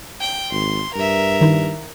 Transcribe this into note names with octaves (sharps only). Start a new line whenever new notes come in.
G5
G#1 C6
G2 A#4 E5
D#3 D#4 E4